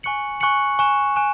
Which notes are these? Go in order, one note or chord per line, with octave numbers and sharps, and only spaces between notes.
G#5 C#6 F#6 C#7 F#7
G#5 C#6 F#6 C#7 F#7
G#5 C#6 F#6 E7
G#5 C#6 F#6 E7